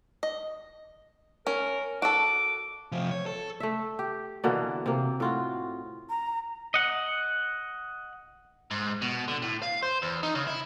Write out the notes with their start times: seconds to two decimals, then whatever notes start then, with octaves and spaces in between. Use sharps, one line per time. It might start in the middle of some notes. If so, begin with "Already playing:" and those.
0.23 D#5
1.47 C#4 A#4
2.02 F#4 A4 D6
2.92 C3 F3
3.11 C#5
3.26 A4
3.60 A3 E5
3.99 G4
4.44 B2 D3 E3 A#3
4.86 C3 A#3
5.20 A2 F4 F#4
6.10 A#5
6.74 D#5 F#5
8.71 G#2
9.02 B2
9.28 D3
9.42 A2
9.62 F5
9.83 C5
10.02 E2
10.23 D#4
10.35 C#3
10.47 E4